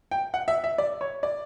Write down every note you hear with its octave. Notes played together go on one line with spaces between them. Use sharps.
G5
F#5
E5
E5
D5
C#5
D5